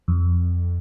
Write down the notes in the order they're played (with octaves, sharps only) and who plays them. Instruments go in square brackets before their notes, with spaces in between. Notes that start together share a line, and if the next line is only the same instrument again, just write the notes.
[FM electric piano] F2